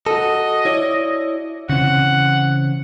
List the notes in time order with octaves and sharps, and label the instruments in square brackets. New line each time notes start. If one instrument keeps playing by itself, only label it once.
[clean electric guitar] F#4 A4 [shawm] D#5
[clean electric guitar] E4 C#5 D5
[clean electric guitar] C#3 E3 C4 [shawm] F#5